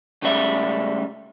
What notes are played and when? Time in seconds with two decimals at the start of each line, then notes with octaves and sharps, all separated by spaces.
0.22 C#2 A2 C#3 G3 E5